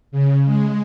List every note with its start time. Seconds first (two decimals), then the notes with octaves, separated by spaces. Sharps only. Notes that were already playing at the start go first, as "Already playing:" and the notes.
0.11 C#3
0.45 G#3